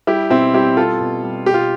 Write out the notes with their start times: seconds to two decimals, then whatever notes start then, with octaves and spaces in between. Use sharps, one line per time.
0.07 G3 E4 G4
0.30 B2 C4 E4
0.54 G3 E4 G4
0.77 G3 F4 A4
1.00 B2
1.23 G3
1.46 B2 G4
1.54 F4